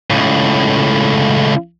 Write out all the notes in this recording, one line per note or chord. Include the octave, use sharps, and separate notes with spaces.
C#2 A2